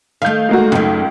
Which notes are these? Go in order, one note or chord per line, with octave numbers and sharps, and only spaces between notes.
D#3 A3 F5 G6
G#3 A#3 F#4
C#2 F#2 D#3